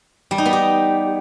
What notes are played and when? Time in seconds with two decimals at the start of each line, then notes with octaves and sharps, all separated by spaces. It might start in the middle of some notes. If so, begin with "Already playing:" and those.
0.31 G3
0.38 D#4
0.46 B3
0.53 G4